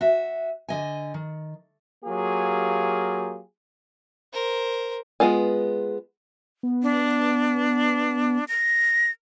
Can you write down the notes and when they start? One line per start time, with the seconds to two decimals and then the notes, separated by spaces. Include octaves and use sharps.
0.01 F#4 E5
0.68 D3 D#5 G#5
1.14 D#3
2.05 F#3 A#3 F4 G4 G#4
4.33 A#4 C5
5.20 G#3 B3 F4 G#5
6.63 B3
6.83 D4
8.48 A#6